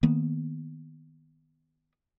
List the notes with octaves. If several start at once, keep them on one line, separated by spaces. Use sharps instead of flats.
D#3 A#3 B3